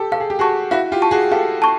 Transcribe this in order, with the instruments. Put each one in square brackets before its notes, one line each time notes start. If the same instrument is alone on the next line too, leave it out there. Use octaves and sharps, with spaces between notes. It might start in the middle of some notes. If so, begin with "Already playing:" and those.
Already playing: [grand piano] G4 A4
[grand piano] A4 [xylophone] F5
[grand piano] G#4
G4
[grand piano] F#4 G#4 [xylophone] A5 C#6
[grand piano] E4 F#4 [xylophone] F5
[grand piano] F4 G4
[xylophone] A5 C#6
[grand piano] F#4 G#4
[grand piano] G4 A4 [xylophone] F5
[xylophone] A5 C#6